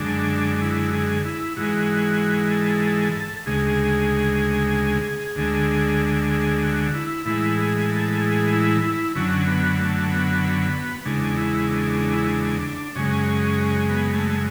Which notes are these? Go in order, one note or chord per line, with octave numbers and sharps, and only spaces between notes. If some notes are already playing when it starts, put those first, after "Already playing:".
Already playing: F#2 D3 G#3 D4
E4
G#4
E4
G#2 E3 G#3 F#4
A4
D2 C#3 G#3 G#4
D2 D3 G#3
G#4
F#4
E4
A2 E3 G#3 E4
G#4
A4
G#4
E4
E4
F#2 D3 F#3 C#4
B3
A3
B3
E2 C#3 G#3 D4
E4
D4
D4
E4
D4
F#2 C#3 G#3 C#4
B3
A3